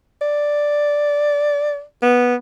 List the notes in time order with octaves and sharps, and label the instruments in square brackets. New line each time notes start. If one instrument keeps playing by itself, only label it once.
[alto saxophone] D5
B3